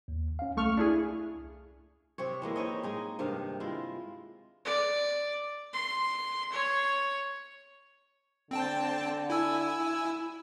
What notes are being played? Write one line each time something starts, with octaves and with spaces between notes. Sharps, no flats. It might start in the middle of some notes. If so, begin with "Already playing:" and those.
D#2
C#4 F5
C2 A3 C#6 F6
D4 E4 G#4
C3 C4 C#5
E3 G#3 A#3 E4
C4 D#4 C#5 D#5
G#3 D#4 G#4
G2 C3 D#3 F5
G#3 E4 F4
D5
C6
C#5
D3 C4 G5 A5
E4 G#5 E6